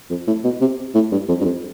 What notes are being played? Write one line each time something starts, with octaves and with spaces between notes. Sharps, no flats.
F2
A2
B2
C3
A2
G2
F2
G2
F2